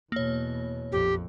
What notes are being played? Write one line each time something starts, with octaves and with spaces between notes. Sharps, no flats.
E2 B2 A#3 C#5
A#1 F2 G4